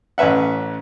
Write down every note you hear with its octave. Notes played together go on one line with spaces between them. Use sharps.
A1 C#4 B4 E5 F#5